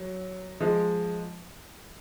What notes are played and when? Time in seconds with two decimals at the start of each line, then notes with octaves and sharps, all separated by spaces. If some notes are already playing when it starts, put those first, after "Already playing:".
Already playing: F#3
0.60 F3 G#3